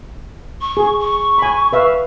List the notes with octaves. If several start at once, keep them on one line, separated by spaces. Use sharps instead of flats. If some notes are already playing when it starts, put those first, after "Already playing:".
C#6
G#4
C#6
G#5 B5
B4 E5 F5